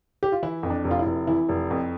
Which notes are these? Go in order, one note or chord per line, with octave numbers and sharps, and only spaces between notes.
G4
F4
E3 E4
F2
D4
F1
F4
E4
F1
E3 E4
F1
F2